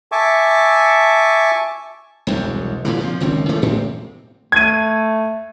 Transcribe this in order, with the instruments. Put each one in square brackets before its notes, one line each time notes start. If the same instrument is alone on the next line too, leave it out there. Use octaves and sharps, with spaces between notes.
[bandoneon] E5 G#5 A5 C#6 D6
[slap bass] E1 C2 F#2
A#2 D3 E3
C3 F3
F#1 C#2 D#3 C4
E3 F3 A3 A#3
A1 A2 C3 C4
[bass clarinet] A3 [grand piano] G#6 D#7